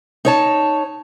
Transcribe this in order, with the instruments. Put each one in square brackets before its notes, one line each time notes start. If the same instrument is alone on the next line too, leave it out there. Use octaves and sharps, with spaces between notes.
[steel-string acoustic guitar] D#4 C#5 A5